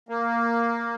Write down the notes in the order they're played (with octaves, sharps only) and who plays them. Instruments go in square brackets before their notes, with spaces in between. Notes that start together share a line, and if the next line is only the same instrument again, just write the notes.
[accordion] A#3